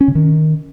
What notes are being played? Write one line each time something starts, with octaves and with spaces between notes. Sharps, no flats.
C#4
C#3
D#3